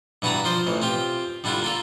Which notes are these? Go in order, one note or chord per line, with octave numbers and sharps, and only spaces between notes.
G2 E3 F#4 B4 A5 A#5
F3 F4 C5 D5
A1 E3
C4 F4 G4
D3 G3 D4 E4 F4
A#3 F4 A4